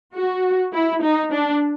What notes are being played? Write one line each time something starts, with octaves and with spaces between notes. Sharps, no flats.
F#4
E4
D#4
D4